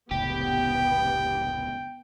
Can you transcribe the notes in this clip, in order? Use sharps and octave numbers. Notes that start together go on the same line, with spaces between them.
F1 C#2 A2 B3 G4 G5